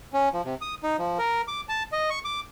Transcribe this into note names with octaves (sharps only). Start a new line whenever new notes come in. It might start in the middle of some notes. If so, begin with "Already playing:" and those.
C#4
F3
C3
D#6
D#4
F3
A#4
D6
A5
D#5
C#6
D6